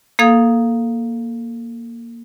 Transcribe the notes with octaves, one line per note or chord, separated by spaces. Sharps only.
A#3 A4 F5 D#6 G#6